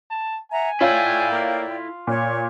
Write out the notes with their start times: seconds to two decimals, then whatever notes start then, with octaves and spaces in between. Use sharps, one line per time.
0.10 A5
0.51 E5 F#5 G#5 A#5
0.81 E4 F4 A4 C#5 D5 G5
1.31 A#3
1.70 F4
2.07 A#2 C#5